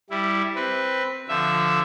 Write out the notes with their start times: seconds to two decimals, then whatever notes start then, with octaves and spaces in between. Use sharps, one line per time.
0.10 G3 E4
0.55 C4 B4
1.28 D3 F3 E5